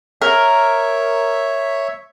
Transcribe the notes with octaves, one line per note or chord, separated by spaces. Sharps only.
A#4 C#5 E5